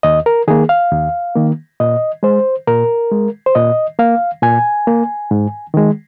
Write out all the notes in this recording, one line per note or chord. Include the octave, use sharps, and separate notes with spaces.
D#2 D#5
A#4
D#3 A#3 G#4
F5
D#2
D#3 A#3
A#2 D#5
G#3 C5
A#2 A#4
G#3
C5
A#2 D#5
A#3 F5
A#2 G#5
A#3
G#2
D#3 G#3